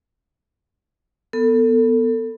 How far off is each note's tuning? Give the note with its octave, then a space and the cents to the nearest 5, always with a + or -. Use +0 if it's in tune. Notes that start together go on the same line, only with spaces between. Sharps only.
B3 +0 A4 +25